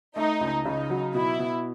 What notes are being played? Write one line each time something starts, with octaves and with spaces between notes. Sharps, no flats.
A3 D#4
C#2
C#3 D#4
F#3
B2 E4
B2